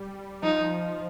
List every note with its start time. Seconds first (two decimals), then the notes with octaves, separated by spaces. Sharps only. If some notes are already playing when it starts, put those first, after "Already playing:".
Already playing: G3
0.43 F3 D#4